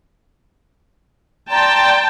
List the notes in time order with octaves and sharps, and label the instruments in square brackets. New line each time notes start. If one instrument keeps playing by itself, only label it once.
[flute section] D5 A#5 C6 [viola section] G5 A5